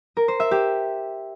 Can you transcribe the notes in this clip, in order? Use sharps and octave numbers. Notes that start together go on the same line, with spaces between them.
A#4
C5
E5
G4